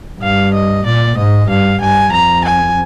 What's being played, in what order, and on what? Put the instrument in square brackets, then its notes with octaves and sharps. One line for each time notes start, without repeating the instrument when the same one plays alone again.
[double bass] G2 [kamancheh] F5
[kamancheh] D#5
[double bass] A#2 [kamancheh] D5
[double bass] G#2 [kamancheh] D#5
[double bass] G2 [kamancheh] F5
[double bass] G2 [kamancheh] G#5
[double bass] F2 [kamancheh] A#5
[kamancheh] G#5